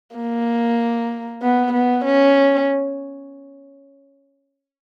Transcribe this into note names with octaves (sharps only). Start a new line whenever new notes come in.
A#3
B3
B3
C#4